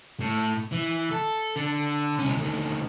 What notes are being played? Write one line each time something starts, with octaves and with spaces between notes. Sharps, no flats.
A2
E3
A4
D3
C2 C#4
D2 D#3